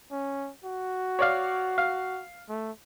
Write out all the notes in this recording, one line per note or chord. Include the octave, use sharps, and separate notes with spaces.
C#4
F#4
C#5 D5 F5
F5
A3